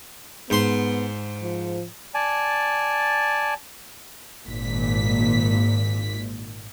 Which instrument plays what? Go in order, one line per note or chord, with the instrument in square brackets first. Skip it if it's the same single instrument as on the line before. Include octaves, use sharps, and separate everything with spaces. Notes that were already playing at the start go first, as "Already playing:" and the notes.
[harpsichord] G#2 C6 [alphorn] B3
[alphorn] F3
[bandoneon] D5 G#5 A5
[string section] G#1 A#2 B6